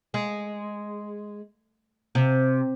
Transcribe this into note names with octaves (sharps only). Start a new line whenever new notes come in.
G#3
C3